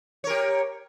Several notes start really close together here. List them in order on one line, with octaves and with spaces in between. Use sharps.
C#5 A#4 G4